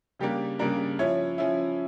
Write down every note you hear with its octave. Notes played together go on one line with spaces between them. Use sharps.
C#3 G3 A#3 D4 G4
C#3 G3 A#3 D4 A#4
F3 C#4 E4 C#5
F3 C#4 E4